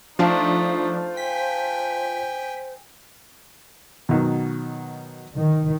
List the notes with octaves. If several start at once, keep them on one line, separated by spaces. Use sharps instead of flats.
F3 A3 D4 D#4 F4 C5 F5 A5
G5 G#5 B6
B2 D#3 F#3
D#3